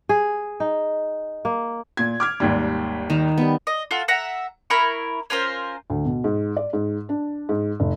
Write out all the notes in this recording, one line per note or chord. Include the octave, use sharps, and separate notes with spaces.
G#4
D#4
A#3
A#2 G#6
D6 F6 G#6
G#1 D#2 G3
D#3 A#5
G3 B3
D#5
F4 F#4 A4
E5 F#5 A#5
E4 A#4 B5 C#6
C#4 F4 A#4 C5
D2
B2
G#2
D5
G#2
D4
G#2
F1